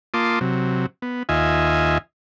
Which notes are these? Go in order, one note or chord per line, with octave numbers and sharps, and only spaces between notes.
A#3 F4 A5 C6 D6 D#6
C3 F#3
B3
D#2 F4 D#5 E5 G#5